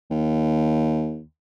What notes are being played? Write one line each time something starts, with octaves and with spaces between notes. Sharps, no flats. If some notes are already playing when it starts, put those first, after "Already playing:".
D#2